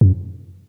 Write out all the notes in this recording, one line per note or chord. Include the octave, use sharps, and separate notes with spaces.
F#2